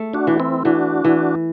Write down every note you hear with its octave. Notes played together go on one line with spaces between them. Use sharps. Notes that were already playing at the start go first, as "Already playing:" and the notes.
Already playing: A3
D4 F#4
E3
C4 E4
E3 D4 F#4
E3